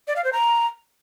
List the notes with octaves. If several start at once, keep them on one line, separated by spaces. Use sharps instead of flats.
D5
F5
C5
A#5